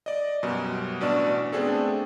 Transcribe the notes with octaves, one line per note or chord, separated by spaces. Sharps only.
D5 D#5
F#2 B2 G3
A1 B2 D4 D5 C#6 E7
A3 B3 C4 D4 G#4 A4